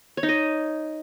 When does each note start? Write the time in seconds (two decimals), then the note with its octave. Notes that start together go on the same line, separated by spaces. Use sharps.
0.17 C#5
0.23 D#4
0.29 D#5